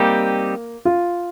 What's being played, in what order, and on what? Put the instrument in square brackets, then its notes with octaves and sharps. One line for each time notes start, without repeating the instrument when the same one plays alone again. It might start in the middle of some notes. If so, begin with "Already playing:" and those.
Already playing: [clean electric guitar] G3 C4 D#4 G4 [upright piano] A#3
[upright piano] F4